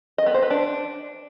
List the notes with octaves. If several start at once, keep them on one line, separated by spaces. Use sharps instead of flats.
D#5
B3
C5
B4
D4